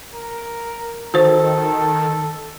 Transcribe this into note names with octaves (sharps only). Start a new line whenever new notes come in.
A#4
D#3 F#4 A4 C5